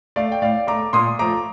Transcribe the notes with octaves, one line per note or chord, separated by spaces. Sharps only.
A3 D5 F5
G5
A2 D5 F5
A3 A#5 D6
A#2 C6 D#6
F3 A3 A#5 D6